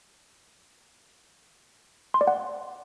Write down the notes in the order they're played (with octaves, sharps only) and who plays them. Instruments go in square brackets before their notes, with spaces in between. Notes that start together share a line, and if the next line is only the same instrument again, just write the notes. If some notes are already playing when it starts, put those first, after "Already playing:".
[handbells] C6
D5
F#5